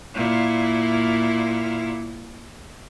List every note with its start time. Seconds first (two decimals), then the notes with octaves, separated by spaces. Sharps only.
0.15 A#2 E4